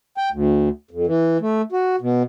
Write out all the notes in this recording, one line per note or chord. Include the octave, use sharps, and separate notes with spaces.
G5
D2
F2
E3
A3
F#4
B2